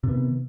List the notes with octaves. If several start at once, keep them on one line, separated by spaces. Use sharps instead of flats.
C3 D#3 B3